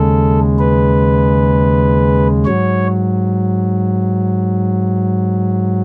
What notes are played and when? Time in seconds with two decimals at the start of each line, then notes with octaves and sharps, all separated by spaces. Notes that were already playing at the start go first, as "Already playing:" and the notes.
Already playing: D#2 C#3 G#3 A4
0.59 B4
2.45 G#2 F#3 C#5